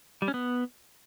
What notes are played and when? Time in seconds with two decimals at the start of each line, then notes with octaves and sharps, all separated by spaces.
0.22 G3
0.28 C#4
0.34 B3